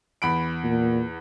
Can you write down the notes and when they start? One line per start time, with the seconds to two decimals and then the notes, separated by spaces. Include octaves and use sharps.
0.22 E2 B5 D7
0.64 A#2